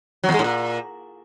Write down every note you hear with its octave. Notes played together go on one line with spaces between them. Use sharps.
F#3
E2
G#3
A2
A#2